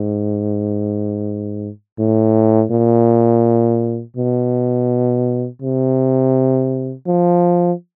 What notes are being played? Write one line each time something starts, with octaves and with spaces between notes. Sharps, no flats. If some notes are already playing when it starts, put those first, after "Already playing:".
Already playing: G#2
A2
A#2
B2
C3
F3